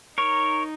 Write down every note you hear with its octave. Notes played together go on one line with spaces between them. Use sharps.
D#4 A#4 C#5